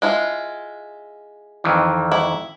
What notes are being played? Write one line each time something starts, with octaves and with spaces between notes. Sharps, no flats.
G#3 E4 F4
F2 D#3 E3
E4